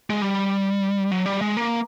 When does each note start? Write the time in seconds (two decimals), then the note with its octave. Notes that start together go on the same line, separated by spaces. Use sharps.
0.10 G#3
0.22 G3
1.11 F#3
1.26 G3
1.41 G#3
1.57 A#3